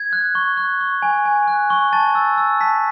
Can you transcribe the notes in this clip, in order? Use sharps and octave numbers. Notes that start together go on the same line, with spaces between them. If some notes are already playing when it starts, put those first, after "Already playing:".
Already playing: G#6
F#6
C#6
F#6
C#6
G#5
G#5
F#6
C#6
A5 A6
E6
E6
A5 B6